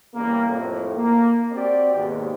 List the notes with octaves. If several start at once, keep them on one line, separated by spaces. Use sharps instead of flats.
E2 C#3 G3 A#3
F2 A2
A#3
C4 F#4 G4 D5
D#2 G#2 B2